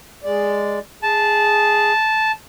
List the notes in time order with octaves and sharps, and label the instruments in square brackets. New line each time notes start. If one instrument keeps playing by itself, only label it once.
[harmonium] G#3 D5
[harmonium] G#4 [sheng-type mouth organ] A5